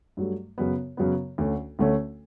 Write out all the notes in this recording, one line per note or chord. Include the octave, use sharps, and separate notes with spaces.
G2 F#3 A3
F#2 C#3 F#3 B3
F#2 C#3 F#3 B3
D2 D3 A3 C#4
D2 D3 A3 C#4